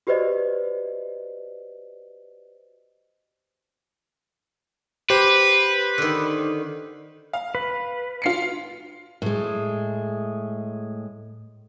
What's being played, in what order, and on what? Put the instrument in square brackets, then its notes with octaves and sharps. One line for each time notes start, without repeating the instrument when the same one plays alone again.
[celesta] F#4 G4 B4 C5 D5 D#5
[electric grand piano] G4 C5 [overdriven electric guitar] B4
[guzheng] D3 D#3
[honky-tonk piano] F5
[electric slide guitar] B4
[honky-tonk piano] F4 C7 C#7
[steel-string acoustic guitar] A2 G#3